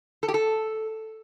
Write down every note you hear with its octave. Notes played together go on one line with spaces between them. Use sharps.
A4
G4
A4